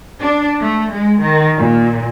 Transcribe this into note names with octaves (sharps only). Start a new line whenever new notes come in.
D4
A3
G#3
D#3
A#2